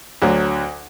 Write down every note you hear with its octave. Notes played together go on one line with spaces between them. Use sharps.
D2 D3 F#3